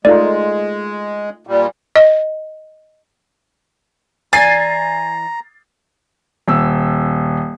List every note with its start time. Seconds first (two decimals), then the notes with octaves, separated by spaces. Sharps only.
0.05 G#3 A3 D#4 F4 D5
1.47 A#2 G3
1.96 D#5
4.33 E3 D5 G#5 A#5 A6 C7
6.48 D#1 E6